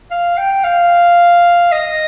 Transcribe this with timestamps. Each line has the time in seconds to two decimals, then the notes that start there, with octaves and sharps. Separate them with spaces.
0.11 F5
0.37 G5
0.64 F5
1.72 D#5